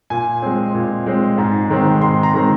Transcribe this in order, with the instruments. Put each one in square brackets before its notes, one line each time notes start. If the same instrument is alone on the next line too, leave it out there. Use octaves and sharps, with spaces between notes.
[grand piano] A#2 G#5
G#3 C4
A#2
G#3 C4
G#2
D#3 G#3 C4
G#2 C6
A#5
D#3 G#3 C4